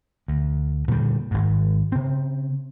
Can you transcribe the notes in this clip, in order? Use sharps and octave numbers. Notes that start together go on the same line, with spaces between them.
D2
A#2 D3 F#3 G3
G#1 G#2
C#3 C4